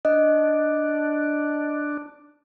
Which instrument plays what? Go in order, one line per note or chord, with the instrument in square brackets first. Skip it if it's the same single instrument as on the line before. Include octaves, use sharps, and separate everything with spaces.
[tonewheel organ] D4 [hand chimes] D#5